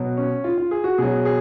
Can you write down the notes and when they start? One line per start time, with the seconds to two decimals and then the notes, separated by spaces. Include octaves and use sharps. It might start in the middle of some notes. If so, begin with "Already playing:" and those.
Already playing: B2 F#3
0.17 C#4
0.44 F4
0.58 F4
0.71 G#4
0.84 F#4
0.98 B2 F#3 G#4
1.25 G#4